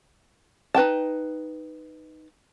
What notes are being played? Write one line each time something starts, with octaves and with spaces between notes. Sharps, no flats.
D#4 B4 G5 A5